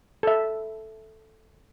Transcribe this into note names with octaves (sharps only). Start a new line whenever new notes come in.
A4 E5